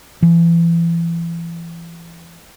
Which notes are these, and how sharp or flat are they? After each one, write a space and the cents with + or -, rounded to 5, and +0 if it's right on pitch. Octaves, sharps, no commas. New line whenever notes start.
E3 +35